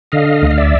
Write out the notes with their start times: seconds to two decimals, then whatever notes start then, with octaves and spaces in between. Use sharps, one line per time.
0.12 D3 D#5 F5
0.42 D2
0.51 F5
0.58 D5 E5